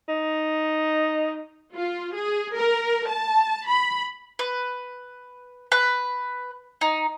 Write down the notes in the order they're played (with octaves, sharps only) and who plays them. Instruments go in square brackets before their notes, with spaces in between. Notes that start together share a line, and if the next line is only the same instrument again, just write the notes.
[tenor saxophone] D#4
[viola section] F4
G#4
A#4
A5
B5
[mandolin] B4
B4
D#4